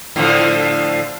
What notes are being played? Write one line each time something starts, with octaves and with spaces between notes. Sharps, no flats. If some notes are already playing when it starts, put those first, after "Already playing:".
A2 D3 F3